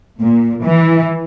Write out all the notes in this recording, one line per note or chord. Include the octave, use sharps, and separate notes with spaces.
A#2
E3